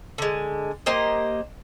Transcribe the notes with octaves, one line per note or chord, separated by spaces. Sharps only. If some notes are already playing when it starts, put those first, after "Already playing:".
D3 G#3
A#3 G4 C5 D#5